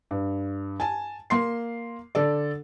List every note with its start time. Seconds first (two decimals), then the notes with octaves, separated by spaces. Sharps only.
0.11 G2
0.80 G#5 A5
1.30 A#3 C6 C7
2.15 D3 A4 D5